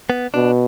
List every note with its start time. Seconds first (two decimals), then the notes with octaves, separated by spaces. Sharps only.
0.10 B3
0.34 B2 D4